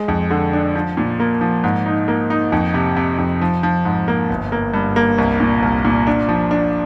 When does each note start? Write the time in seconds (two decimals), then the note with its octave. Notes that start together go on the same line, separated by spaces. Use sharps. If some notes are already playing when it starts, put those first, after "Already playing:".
Already playing: G#3
0.08 F2
0.30 D3
0.53 D4
0.75 F3
0.97 A#2
1.20 A#3
1.41 F3
1.64 G#2
1.86 D#4
2.08 A#3
2.30 D#4
2.52 F2
2.74 C3
2.97 C3
3.19 F2
3.41 F3
3.63 F3
3.85 G#2
4.08 A#3
4.30 G1
4.52 A#3
4.74 G2
4.96 A#3
5.18 C2
5.40 A#2
5.62 C2
5.85 A#2
6.07 D4
6.28 F3
6.51 D4